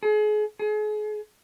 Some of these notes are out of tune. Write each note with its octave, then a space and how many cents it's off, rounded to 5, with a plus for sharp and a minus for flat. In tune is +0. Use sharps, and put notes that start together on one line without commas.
G#4 +35
G#4 +35